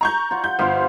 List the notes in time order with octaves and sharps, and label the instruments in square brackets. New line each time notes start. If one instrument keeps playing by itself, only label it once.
[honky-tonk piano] A#5 C#6 G6
[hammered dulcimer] F4 F#5
[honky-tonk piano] G6
[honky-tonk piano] G1 [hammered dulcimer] F4 C5 F5